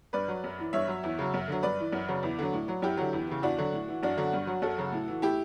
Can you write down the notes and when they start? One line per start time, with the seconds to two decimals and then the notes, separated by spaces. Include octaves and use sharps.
0.13 G2 B4 D5
0.28 F#3
0.44 F#2
0.59 E3
0.73 G2 C#5 E5
0.88 F#3
1.04 E2
1.19 C#3 F#3
1.34 F#2
1.48 D3 F#3
1.63 G2 B4 D5
1.79 E3
1.93 F#2
2.08 C#3 F#3
2.23 E2
2.39 D3 F#3
2.53 A2
2.68 F#3
2.82 F#2 E4 G4
2.97 D3 F#3
3.13 E2
3.27 C#3 E3
3.42 E2 D4 F#4
3.58 D3 F#3
3.73 A2
3.88 E3
4.03 F#2 D4 F#4
4.17 D3 F#3
4.33 G2
4.47 F#3
4.62 F#2 F#4 A4
4.78 C#3 F#3
4.92 A2
5.08 E3
5.22 A2 E4 G4